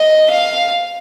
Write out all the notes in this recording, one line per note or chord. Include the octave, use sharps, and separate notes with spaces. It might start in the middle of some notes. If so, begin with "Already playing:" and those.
Already playing: D#5
F5